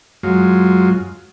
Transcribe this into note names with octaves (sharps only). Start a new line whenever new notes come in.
F#2 F#3 G#3 F4